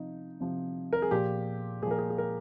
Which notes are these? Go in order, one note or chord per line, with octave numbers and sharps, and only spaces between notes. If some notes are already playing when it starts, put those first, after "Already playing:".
Already playing: C3 F3 D#4
C3 F3
A#4
G#4
A#2 F3 G4
A#2 F3 G#4 A#4
G#4
G#4
A#4